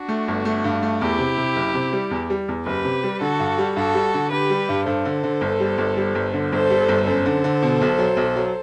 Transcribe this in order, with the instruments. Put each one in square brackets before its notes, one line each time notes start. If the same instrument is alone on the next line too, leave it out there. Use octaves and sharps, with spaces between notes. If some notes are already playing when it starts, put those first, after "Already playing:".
Already playing: [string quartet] D4 F#4
[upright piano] A3
G1
A3
G2
A3
[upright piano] E2 [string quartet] E4 G4
[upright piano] C3
C3
F#1
C3
G3
E2
G3
E2
[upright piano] F#1 [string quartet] G4 B4
[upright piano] C3
G3
[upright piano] D3 [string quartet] F#4 A4
[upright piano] G2
G3
[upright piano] G2 [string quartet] F#4 A4
[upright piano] G3
D3
[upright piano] D3 [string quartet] G4 B4
[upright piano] G3
G2
[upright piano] G2 [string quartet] A4 C5
[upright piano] D3
D3
G1
G3
G1
G3
G1
D3
[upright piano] G1 [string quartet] A4 C5
[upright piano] G3
G1
[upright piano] F#2 [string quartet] A4 C5
[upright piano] D3
D3
B2
B1
F#3
B1
F#3